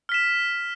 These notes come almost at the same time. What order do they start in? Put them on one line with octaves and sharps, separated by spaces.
F6 B6 E7